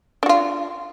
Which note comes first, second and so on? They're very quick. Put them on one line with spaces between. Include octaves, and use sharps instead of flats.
D4 F#4 F4